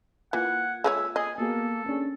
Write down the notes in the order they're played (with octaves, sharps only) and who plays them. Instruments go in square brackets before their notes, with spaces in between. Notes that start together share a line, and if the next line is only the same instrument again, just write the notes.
[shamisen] E3 [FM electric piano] A#3 F4 G#6 [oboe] F#5
[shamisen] G#3 G#4 C#5 [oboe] E5
[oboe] G#4 [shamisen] D#5 [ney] G#5
[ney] A#3 [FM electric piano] B3 F#4 G#4 [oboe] A4
[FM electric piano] A#3 D4 G#4 [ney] C#4